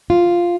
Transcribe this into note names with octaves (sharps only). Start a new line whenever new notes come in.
F4